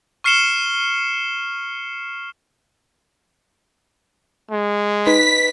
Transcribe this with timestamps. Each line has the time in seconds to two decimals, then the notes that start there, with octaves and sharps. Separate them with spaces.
0.24 C#6 F6 C7 C#7 E7 G7
4.51 G#3
5.07 D#4 B4 B6